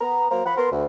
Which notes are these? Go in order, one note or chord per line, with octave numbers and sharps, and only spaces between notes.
B3 A#5
F#3 A#3 C5 A#5
F3 F#5 B5
B3 A#4 B4 C6
D2